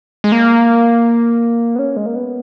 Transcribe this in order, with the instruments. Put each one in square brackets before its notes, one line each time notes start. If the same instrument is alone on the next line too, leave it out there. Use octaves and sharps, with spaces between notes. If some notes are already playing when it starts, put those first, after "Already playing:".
[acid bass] G#3
A#3
B3
C#4
G#3
A#3
B3